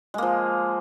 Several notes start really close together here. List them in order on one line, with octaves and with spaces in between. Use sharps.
G#3 A#3 F3